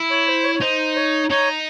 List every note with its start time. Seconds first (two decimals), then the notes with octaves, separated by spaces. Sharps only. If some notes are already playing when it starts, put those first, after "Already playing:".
Already playing: E4
0.10 C#5
0.27 C5
0.44 C#5
0.55 C#5
0.61 D#4 C5
0.96 C#5
1.30 D#4 C#5